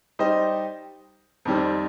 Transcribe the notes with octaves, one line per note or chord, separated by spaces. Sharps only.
G3 D#4 G4 C5 D#5
F2 D#3 G3 C4